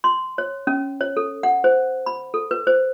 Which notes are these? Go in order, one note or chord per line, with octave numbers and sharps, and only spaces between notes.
C6
C#5
C#4
C#5
A4
F#5
C5
B5
A4
B4
C5